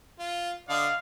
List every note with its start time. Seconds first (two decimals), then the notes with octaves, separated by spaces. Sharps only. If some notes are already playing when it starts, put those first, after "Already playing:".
0.19 F4
0.69 D3 D5 D#5 F5